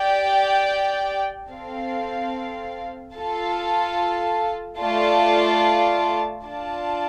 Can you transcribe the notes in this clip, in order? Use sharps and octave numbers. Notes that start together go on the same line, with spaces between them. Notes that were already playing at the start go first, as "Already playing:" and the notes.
Already playing: G4 D5 G5
C4 A4 F5
F4 A4 F5 A5
A3 F4 D5 F5 A5
D4 F4 D5 A5